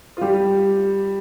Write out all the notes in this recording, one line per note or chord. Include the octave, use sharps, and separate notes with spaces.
F4
G3 G4